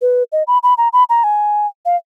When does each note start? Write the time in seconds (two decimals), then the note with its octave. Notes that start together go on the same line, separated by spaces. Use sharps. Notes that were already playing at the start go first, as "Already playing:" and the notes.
0.02 B4
0.32 D#5
0.47 B5
0.63 B5
0.78 A#5
0.93 B5
1.10 A#5
1.24 G#5
1.85 F5